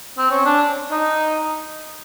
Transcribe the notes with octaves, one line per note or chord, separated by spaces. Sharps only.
C4
C#4
D4
D#4